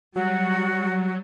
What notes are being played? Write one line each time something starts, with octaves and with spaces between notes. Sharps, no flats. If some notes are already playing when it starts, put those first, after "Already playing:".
F#3 G3 F#4